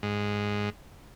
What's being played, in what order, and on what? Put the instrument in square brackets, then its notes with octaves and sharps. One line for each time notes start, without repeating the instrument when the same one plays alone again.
[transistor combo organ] G#2